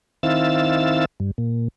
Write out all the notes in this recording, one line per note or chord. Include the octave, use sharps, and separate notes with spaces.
D#3 C4 E4 F5 E6 A6
G2
A#2